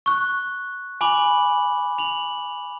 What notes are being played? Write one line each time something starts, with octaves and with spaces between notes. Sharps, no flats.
C#6 F#6
G#5 B5 D6 F#7
F7 F#7